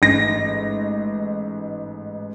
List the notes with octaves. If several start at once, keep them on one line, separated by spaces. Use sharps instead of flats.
A1 G#2 A#6